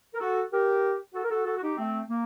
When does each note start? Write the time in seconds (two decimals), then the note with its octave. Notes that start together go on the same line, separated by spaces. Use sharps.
0.14 A#4
0.20 F#4 A4
0.52 G4 A#4
1.14 F#4 A4
1.24 A#4
1.30 F#4 A4
1.46 F#4 A4
1.57 F#4
1.62 D#4 G4
1.77 A3 C4
2.09 A#3